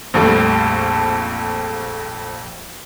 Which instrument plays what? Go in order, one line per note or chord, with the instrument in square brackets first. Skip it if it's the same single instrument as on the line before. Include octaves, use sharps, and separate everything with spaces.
[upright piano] A#1 F2 G3 A3